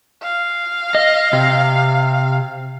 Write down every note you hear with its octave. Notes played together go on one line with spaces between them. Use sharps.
F5
D#5
C3